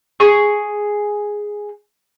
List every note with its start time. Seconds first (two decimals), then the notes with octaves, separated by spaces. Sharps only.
0.20 G#4 C#6